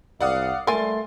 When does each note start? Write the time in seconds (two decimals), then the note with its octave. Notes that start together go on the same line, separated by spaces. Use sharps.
0.20 C2 D5 F5 F#5 D#6
0.67 G3 A3 A#4 G#5 C6 A6